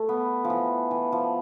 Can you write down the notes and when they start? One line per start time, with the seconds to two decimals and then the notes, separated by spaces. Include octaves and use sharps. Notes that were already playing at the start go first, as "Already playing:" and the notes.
Already playing: A3
0.09 B3
0.44 F3
0.50 E3
0.91 E3
1.12 F3